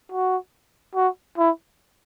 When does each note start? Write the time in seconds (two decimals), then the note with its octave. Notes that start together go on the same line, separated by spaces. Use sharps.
0.12 F#4
0.95 F#4
1.38 E4